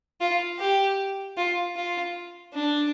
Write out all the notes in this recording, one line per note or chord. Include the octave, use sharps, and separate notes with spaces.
F4
G4
F4
F4
D4